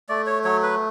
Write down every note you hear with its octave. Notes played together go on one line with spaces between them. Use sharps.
A3 D5
C#5
F#3 C#5
B4